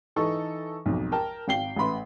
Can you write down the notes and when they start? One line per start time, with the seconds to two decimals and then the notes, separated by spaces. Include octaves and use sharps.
0.16 E3 D#4 A4 C#6
0.86 B1 F2 G#2
1.12 A#4 G5 A5
1.48 G#1 F5 G5 C7 G7
1.76 A1 A3 B4 B5 C6